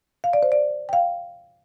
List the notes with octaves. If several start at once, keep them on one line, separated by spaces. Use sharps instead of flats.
F5
D5
C5
D5
G5
F5